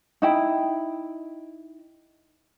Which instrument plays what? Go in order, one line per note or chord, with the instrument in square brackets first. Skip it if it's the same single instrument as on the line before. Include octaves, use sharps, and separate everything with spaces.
[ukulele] D#4 E4 G5